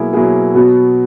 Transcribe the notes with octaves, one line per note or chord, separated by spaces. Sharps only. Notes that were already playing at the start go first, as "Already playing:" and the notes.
Already playing: B2 F#3 A#3 E4 G#4
B2 F#3 A#3 E4 G#4
B2 F#3 B3 F#4